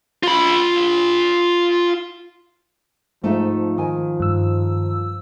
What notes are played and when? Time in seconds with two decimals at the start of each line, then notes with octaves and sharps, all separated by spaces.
0.23 F4 B5
3.23 G#2 F3 A3 D#4 E5
3.78 D#3 G#5
4.20 G2 E6